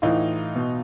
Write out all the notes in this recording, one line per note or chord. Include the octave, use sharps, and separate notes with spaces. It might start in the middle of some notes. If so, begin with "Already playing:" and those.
A2 E3 D#4 F4
B2